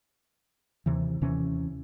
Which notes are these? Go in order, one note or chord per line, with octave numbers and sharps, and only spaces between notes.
D#2 C3 E3
D#2 C3 E3 C#4